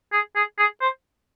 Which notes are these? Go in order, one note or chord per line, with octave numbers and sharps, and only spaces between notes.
G#4
G#4
G#4
C5